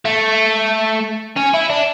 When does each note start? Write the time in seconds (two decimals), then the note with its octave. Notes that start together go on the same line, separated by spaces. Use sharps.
0.05 A3
1.37 C#4
1.54 E4
1.70 D4